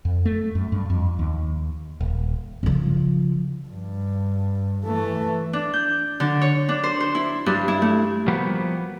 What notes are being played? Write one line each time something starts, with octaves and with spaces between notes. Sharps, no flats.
F2
A3
F#2
G2
F2
D#2
D#1
C#3 F3
G2
E3 A3
D4
G6
D3
C#5
D4
C5
C5
E4
G2
E4
A3
F3 G3 A#3 B3 F#4 G4